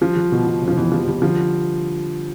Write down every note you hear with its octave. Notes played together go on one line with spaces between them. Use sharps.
F3 G3
G3
B2
B2
F1
F3
B2 E3
F3 G3
G3
D3 F3